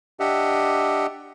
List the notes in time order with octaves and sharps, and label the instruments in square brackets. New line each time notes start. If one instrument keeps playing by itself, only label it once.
[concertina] D4 G4 D#5 E5 F#5